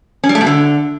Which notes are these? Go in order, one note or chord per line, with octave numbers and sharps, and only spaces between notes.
C#4
G3
A3
B2
D3